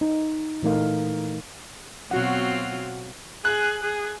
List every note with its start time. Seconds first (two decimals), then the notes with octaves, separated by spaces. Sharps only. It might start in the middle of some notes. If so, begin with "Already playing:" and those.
0.01 D#4
0.63 A#2 E3 A3 D#4 A#4 F5
2.11 B2 F#3 C4 F4 F#4 F#5
3.45 G#4 F#6
3.83 G#4